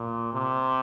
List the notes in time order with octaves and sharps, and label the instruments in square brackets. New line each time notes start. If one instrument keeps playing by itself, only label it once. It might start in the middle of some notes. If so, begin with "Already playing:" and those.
Already playing: [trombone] A#2
C3